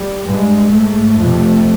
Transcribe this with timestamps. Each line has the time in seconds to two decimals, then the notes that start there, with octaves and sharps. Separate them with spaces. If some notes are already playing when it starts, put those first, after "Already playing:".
Already playing: G3
0.24 G2 G#3
0.71 G#2 A3
1.19 F2 C3